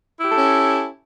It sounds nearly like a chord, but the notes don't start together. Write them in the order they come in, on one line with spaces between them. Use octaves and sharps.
E4 G4 A4 C#4